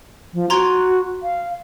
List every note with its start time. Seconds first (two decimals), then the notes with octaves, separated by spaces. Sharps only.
0.34 F3
0.50 F#4 A#5 C6 G#6
1.23 F5